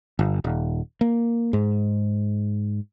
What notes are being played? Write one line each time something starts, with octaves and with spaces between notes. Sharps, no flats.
G1
D#1
A#3
G#2